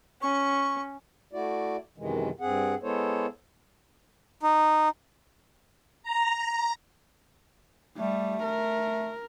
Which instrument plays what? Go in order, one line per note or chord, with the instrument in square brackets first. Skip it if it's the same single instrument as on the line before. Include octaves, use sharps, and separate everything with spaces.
[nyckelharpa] C#4 [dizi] C#6
[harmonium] A3 E4 F#4 D5
F#2 C3 D#3 E3 G#3
G2 C4 G#4 F#5
G#3 B3 E4 A4 C5 C#5
[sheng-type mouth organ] D#4
[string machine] A#5
[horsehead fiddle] G3 [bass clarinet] A3
[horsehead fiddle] A#4